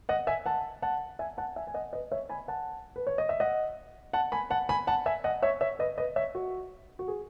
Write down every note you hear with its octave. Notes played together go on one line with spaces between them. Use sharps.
D#5 F#5
E5 G#5
F#5 A5
F#5 A5
E5 G#5
F#5 A5
E5 G#5
G#5
D#5 F#5
B4 D#5
C#5 E5
G#5 B5
F#5 A5
B4
C#5
D#5
E5
D#5 F#5
F#5 A5
G#5 B5
F#5 A5
G#5 B5
F#5 A5
E5 G#5
D#5 F#5
C#5 E5
C#5 E5
B4 D#5
B4 D#5
C#5 E5
F#4
F#4
G#4